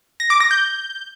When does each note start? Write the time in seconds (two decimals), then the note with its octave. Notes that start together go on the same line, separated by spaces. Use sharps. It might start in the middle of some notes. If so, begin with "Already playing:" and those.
0.20 A#6
0.30 D6
0.40 A#6
0.51 G6